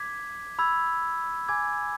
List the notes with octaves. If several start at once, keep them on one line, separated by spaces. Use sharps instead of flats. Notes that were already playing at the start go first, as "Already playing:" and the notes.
Already playing: D6 G#6 B6
B5 E6 G#6
G#5 D6 G#6